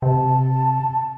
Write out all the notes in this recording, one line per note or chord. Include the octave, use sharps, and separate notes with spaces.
C3 A5